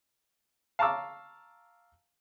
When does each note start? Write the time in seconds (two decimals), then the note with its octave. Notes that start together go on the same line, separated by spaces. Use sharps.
0.79 F5 A5 A#5 C#6 D6 E6